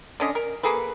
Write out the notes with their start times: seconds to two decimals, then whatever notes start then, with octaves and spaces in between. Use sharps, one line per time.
0.20 D3 C#4 D#5
0.35 A#4
0.63 A#3 G#4 A4 B4